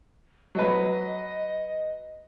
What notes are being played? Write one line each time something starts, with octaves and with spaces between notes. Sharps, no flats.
F#3 B4 D#5